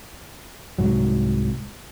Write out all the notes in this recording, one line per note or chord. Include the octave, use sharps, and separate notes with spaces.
C2 G#2 F#3